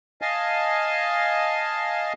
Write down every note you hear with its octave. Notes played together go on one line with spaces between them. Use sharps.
D#5 F5 G#5 A5